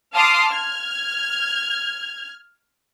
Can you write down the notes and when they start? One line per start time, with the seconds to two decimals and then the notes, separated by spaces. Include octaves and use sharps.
0.13 F5 A5 C6 D6 D#6 F6
0.50 F6 G#6